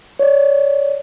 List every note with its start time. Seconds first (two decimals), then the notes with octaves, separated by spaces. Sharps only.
0.19 C#5 D5